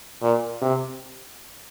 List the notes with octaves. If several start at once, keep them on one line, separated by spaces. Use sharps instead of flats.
A#2
C3